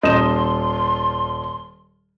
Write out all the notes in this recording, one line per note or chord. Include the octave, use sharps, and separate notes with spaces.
D#1 D#5 C6 E7